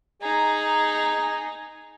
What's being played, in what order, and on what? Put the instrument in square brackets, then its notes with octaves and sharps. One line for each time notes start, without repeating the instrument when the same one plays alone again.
[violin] D#4 [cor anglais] G#4 [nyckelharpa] A#5